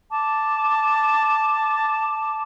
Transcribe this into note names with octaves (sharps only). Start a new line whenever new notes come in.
A5 D6